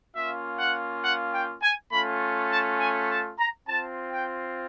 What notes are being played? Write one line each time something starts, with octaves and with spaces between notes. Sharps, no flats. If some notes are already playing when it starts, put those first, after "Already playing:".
A#3 C#4 F4 E5
F#5
F#5
G5
G#5
A3 C#4 F4 B5
A5
G#5
A5
A#5
C4 F4 A5
G5